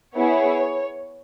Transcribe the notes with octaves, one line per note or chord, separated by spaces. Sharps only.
B3 E4 G#4 C#5